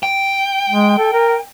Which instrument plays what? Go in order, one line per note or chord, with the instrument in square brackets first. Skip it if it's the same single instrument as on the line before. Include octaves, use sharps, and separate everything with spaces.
[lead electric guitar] G5
[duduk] G#3
A4
A#4